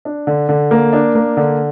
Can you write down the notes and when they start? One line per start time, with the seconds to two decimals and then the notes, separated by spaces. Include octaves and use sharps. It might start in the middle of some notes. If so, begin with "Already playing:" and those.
0.05 D4
0.27 D3
0.49 D3
0.71 A#3
0.93 D4
1.15 A#3
1.37 D3